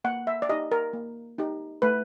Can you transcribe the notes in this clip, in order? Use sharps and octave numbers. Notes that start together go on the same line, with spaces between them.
A#3 F#5
E5
D5
D#4 G4 D#5
A#4
A#3
D#4 G4
A3 B4